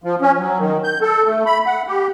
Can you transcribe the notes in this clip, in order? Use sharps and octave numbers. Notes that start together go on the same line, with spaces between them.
F3
C#4
F#3
D#3
G6
A4
A3
B5
F#5
G4